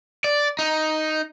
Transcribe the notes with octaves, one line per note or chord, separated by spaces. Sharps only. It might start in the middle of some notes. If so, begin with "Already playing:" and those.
D5
D#4